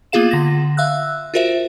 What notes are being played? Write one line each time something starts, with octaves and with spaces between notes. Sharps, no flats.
A#3 B3 F4 G#4 F5 E7
D3 A#6
E5 F5 E6 F#6
F4 F#4 A#4 C5 E5